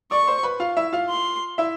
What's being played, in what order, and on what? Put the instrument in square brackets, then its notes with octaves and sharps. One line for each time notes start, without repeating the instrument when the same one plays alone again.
[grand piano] D5 D6 [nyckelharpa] C#6
[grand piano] C5 C6
B4 B5
F4 F5
E4 E5
F4 F5
[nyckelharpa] C6
[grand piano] E4 E5